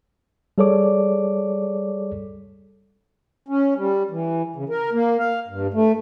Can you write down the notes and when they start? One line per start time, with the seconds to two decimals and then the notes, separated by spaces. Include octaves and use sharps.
0.58 G3 G#4 A4 C#5 D5 D6
3.48 C#4
3.77 G3
4.11 E3
4.56 C#3
4.69 A#4
4.92 A#3
5.19 F5
5.48 G2
5.74 A3